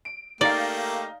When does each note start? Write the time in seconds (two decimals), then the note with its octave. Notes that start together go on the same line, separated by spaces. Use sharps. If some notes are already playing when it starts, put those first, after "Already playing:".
0.05 D7
0.41 A3 A#3 D#4 G4 D5 F5